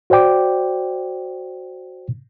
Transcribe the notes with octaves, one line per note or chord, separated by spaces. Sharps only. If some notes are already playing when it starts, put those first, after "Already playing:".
F#4 C5 D5 G5 D6